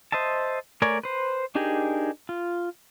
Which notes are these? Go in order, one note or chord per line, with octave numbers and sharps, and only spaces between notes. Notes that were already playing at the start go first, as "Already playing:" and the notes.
C5 D#5 E5 A5
A3 A#4 C#5 D5 G#5
B4 C5
D4 D#4 G4 G#4 A#4
F4